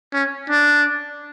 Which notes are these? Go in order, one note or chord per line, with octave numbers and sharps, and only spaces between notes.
C#4
D4